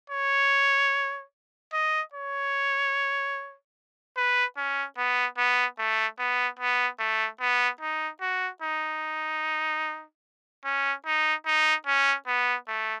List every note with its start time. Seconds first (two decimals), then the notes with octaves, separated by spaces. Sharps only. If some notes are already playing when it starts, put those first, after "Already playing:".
0.10 C#5
1.73 D#5
2.14 C#5
4.17 B4
4.57 C#4
4.98 B3
5.38 B3
5.79 A3
6.19 B3
6.59 B3
7.00 A3
7.41 B3
7.81 D#4
8.21 F#4
8.62 D#4
10.65 C#4
11.06 D#4
11.47 D#4
11.87 C#4
12.27 B3
12.68 A3